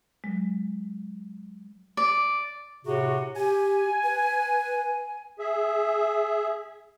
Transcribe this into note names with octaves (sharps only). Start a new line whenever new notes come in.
F#3 G#3
D5
A2 C3 F#4 G#4
G4 G#5
B4
G#4 E5